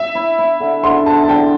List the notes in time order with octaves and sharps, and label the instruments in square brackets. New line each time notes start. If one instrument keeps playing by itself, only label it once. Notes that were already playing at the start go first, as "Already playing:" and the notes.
Already playing: [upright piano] E5
[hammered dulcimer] E4
E4
D3
[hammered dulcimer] D3 [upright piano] C6
[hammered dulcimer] D3 [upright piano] A5
[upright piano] A5
[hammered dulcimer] D3 [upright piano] G5